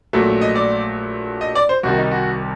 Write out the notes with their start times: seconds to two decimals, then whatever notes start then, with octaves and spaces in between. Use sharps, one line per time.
0.13 A#1 A#2 F#3 A3
0.41 D#5
0.55 D5
1.41 D#5
1.55 D5
1.69 C5
1.83 C2 C3 D#3 G3 F#4
1.98 D#4
2.11 F#4